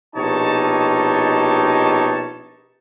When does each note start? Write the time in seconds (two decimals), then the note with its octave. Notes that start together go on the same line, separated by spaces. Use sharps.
0.15 A#1 B2 D#4 G4 C#5 A5